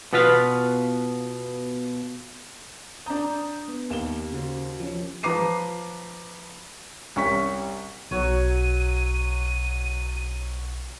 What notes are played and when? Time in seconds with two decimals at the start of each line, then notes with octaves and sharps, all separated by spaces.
0.13 B2 B3 F4 B4 F5
3.06 D4 A#5 D#6 G6
3.68 B3
3.90 D#2 E7 G7
4.32 C#3 F#4 C5
4.80 F3 C#4
5.23 F3 B4 A#5 D6 C7 D#7
7.16 C2 C#4 C#6 B6
8.11 B1 F#3 F#4 C#5 D#7